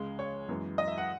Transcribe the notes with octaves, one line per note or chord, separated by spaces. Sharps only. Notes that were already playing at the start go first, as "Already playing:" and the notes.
Already playing: C#2 C#3 G#3
C#5
F#2 E3 G#3 B3
D#5
E5
F#5